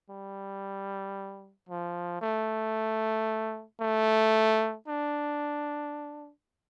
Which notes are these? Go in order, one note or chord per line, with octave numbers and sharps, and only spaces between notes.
G3
F3
A3
A3
D4